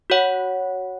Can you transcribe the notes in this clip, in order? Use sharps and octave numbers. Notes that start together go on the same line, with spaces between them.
F#4 C#5 F#5